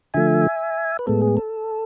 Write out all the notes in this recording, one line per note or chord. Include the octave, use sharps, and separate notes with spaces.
D3 F3 A3 E5 G#5
B4
A2 G#3 B3 A4
G#4
A4